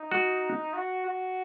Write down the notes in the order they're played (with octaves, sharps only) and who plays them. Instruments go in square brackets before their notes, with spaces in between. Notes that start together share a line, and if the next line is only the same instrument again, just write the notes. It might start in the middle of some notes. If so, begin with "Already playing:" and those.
Already playing: [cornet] D#4
[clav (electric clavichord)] F#4
[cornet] F#4
F#4